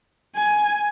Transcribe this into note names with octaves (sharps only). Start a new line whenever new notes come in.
G#5